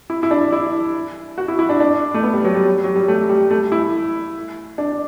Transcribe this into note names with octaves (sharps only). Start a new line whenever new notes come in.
E4
E4
D4
E4
F#4
E4
E4
D4
D4
A3
B3
G3
F#3
G3
F#3
G3
A3
G3
A3
E4
D4